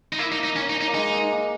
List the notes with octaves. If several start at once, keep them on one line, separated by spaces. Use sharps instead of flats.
D#4
A#3 E4
D#4
D#4
C#4
D#4
D#4
A#3
G#3 D#4
A#3
A#3